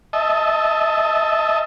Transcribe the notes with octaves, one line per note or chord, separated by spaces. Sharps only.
D#5 E5 A5